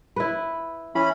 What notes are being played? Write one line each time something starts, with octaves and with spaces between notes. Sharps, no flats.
E4 B4
E3 C#4 B5